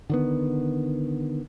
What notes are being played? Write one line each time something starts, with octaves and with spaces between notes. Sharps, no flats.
D3 D#3 B3